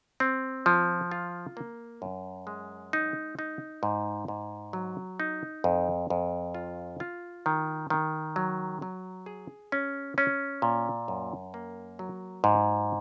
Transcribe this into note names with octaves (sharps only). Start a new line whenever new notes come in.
C4
F3
F4
A#3
F#2
G#3
D#4
D#4
G#2
G#2
F#3
D#4
F2
F2
F4
F4
D#3
D#3
F#3
F#3
G#4
C#4
C#4
A#2
F#2
A#3
F#3
G#2